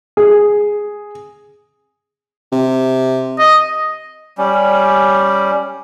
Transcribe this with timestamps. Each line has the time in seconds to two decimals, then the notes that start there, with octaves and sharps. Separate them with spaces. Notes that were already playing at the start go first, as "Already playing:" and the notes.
0.17 G#4
2.52 C3
3.39 D#5
4.38 G3 C#4